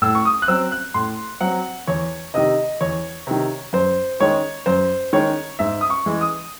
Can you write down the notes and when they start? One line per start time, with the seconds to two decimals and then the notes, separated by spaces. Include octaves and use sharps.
0.02 A2 E6
0.15 C#6
0.25 D#6
0.42 F#6
0.48 F#3 C4 E6
0.72 F#6
0.94 A2 C6
1.41 F#3 C4 F#5
1.87 E2 C#5
2.34 C3 D#3 D#5
2.81 E2 C#5
3.27 C3 D#3
3.73 F#2 C5
4.20 D#3 G#3 C#4 C#5
4.66 F#2 C5
5.13 D#3 G#3 C#4 C#5
5.59 G#2 E5
5.81 D#6
5.90 C#6
6.06 E3 G#3
6.21 D#6